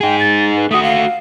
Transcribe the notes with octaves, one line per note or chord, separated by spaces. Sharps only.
D#4 G#4 G5
A6
B4
A3 F#4 D#6
F5